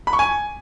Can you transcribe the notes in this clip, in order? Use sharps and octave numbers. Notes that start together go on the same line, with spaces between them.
B5
C#6
G#5